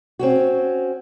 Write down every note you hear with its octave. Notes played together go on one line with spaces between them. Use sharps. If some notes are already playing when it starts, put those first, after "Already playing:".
C4 C#4 F#4